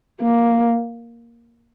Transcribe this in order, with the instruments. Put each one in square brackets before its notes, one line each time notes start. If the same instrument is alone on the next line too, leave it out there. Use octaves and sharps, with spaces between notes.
[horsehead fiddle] A#3